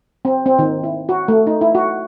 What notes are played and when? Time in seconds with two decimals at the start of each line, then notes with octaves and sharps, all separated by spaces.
0.25 C4
0.46 C4
0.59 D#3
0.84 E4
1.09 F#4
1.28 A3
1.47 D#4
1.61 E4
1.75 F#4